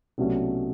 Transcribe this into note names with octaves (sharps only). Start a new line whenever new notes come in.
C2 B2 F#3 A3 C#4